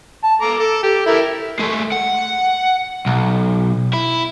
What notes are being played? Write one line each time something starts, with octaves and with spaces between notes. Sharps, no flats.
A5
A4 A#5 D6
A4
G4
E4 A4 A#4
G#3 A3
F#5
B1
E4